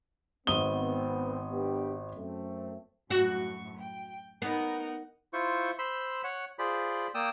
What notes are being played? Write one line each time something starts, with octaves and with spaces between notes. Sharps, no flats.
G#1 B3 C4 D#6 G7
B3 D4 G4
F#2 A3 C4
F#2 A2 F#4 C#6
G5
B3 D#4 A#4 F#5
E4 F4 C5 C#6
C5 B5 C6 E6
C#5 F#5
F4 G#4 C5 D5 B5
A#3 D5 G5 D#6 E6